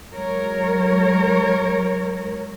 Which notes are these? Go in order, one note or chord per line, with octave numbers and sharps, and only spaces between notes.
F#3 G#3 A#4 C#5